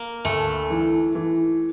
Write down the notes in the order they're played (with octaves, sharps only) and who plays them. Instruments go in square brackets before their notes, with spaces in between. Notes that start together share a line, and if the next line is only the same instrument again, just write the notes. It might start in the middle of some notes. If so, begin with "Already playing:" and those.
Already playing: [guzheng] A#3
[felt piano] D2 [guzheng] A3
[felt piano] E3
E3